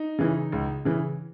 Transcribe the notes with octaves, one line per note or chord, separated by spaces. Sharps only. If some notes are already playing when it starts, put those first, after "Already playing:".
Already playing: D#4
C#3 E3
C#2
C#3 E3